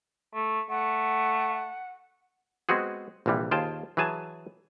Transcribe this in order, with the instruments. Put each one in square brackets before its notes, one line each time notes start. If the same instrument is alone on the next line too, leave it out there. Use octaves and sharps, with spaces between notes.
[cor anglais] A3
[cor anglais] A3 [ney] F#5
[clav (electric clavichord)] G#3 B3 C4 F#4 G#4
A#1 C3 E3 G3
D#2 F4 G#4 C5 G5 A5
E3 F#3 G#4 G#5 A5